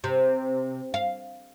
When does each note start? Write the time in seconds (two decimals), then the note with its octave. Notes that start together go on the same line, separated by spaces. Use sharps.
0.04 C3
0.94 F5